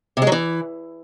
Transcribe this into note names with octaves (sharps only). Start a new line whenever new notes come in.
C3
G#3
F#3
E3